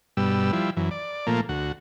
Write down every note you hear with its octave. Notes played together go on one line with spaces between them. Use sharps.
G2 B2 G3 E6
F3 G3 E4
F#2 E3
D5
A#2 F3 A3 A#3
D2 F#4